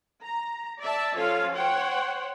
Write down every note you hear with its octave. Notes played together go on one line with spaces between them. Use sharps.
A#5
D5 E5 A5
F3 C#4 F4 A4 C#5 F5
C5 C#5 F#5 G5